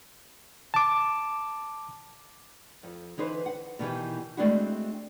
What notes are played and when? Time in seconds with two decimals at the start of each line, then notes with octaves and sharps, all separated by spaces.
0.74 A5 D6
2.83 F2
3.17 D3 E3 D#4 B4 C5
3.46 F#5
3.79 B2 D#3 E3 G4
4.37 G#3 A3 C4 D4 E4 F#4